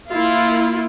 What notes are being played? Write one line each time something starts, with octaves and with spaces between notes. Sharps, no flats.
A#3 E4 F4